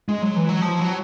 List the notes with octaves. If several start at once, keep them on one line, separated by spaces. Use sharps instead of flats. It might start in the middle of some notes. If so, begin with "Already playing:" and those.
G#3
F#3
E3
F#3
F3
F#3